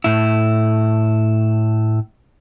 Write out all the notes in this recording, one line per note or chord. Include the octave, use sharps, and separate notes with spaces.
A2 E4